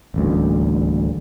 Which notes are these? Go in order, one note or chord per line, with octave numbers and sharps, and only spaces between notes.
D#1 A1 D2